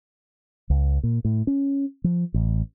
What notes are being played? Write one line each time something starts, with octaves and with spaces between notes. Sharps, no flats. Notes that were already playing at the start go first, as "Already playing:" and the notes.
C#2
A#2
A2
C#4
F3
A1